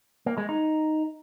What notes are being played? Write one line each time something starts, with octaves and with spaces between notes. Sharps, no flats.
A#3
G#3
D#4